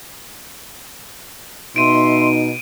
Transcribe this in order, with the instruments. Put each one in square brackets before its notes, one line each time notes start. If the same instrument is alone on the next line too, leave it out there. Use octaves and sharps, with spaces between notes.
[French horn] B2 [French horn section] D#4 [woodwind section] E5 C6 [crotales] D7 D#7